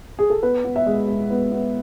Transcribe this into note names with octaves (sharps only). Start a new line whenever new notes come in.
G#4
A4
B3 B4
B3
E5
G#3
G#3
B3
B3